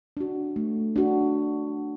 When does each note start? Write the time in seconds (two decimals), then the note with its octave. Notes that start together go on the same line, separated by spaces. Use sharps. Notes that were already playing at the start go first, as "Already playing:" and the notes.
0.17 D4 F#4
0.56 A3
0.96 D4 F#4